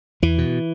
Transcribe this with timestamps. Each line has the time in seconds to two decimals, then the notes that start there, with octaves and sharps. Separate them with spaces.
0.22 E2 E3
0.38 B2